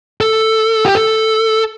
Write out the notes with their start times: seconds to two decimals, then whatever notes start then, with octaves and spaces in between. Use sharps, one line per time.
0.21 A4
0.85 G4
0.95 A4